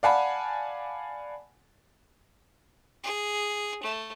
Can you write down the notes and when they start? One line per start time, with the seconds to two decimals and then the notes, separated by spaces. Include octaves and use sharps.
0.03 D5 F5 F#5 G#5 A5 B5
3.04 G#4
3.83 A3